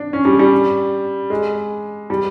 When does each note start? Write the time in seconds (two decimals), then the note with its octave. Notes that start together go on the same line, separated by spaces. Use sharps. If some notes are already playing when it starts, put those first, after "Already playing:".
Already playing: D4
0.13 C#4
0.25 G3
0.39 G3
1.30 G#3
2.10 G3